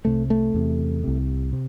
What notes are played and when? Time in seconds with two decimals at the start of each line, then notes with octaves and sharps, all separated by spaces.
0.05 C2 C3 A3
0.30 A3
0.54 E2 C3
1.04 C2 C3
1.53 C3